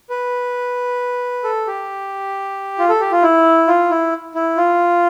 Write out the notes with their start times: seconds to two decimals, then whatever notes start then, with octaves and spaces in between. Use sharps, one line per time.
0.10 B4
1.44 A4
1.67 G4
2.79 F4
2.89 A4
3.00 G4
3.12 F4
3.23 E4
3.67 F4
3.90 E4
4.35 E4
4.57 F4